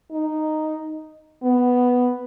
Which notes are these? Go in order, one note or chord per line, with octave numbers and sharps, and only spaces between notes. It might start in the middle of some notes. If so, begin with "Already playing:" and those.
D#4
B3